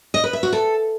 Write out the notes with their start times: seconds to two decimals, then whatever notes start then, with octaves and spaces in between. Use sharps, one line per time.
0.14 D#5
0.24 B4
0.33 E5
0.43 F#4
0.52 A4